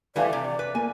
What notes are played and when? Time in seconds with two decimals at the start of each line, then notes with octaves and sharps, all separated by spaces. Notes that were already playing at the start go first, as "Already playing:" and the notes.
0.16 E3 G3 A3 B4 D5 F5 G#5
0.33 C3
0.59 B4
0.75 A#3 G#5